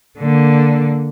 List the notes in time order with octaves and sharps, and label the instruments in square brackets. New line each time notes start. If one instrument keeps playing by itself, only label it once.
[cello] D3 A#3